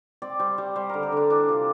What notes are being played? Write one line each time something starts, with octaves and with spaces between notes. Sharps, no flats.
C4 D5
G3 C5
G3 C5
G3 C5
D3 A#4
A4
D3 D4
E3 D4
C3 F4